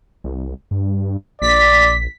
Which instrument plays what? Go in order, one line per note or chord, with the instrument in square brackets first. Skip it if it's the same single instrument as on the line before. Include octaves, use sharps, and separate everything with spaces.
[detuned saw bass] C2
G2
[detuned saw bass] A#1 [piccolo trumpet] D5 [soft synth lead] B6